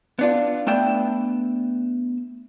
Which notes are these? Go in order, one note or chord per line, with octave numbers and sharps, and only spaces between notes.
B3 D4 F4
A3 B3 D4 E5 G5